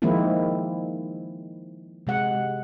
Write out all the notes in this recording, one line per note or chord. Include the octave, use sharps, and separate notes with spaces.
D#3 F3 G#3 A#3 C4 E4
C3 G#3 F#5